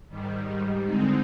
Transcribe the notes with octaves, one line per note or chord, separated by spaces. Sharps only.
G#2 D#3 G3
D3 G#3 C4 D#4